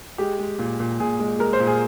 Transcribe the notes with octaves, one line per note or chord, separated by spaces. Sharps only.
G#3 G4
G#3
A#2
A#2
A#2 G#4
G#3
G#3 A#4
C5
A#2
G#4